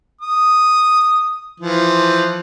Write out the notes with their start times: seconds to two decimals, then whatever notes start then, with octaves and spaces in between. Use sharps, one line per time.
0.21 D#6
1.60 E3 F3